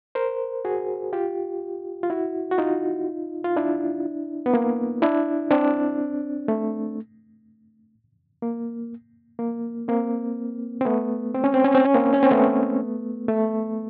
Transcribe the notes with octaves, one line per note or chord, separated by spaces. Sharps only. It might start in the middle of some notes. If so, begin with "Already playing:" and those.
A#4 C5
F#4 G#4
F4 G4
F4
E4 F#4
F#4
D#4 F4
F4
D4 E4
B3
A#3
D4 E4
C4 D4
A3
A#3
A#3
A#3 C4
C4
A3 B3
C4
C#4
C4
C#4
C4
C#4
A#3 C4
C#4
C4
A3 B3
A3